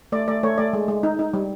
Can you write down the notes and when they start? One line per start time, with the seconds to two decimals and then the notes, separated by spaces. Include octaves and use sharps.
0.12 A3 D5
0.28 A3 D5
0.43 A3 C#5
0.58 A3 D5
0.73 G#3
0.88 G#3
1.03 D#4
1.19 D#4
1.34 G3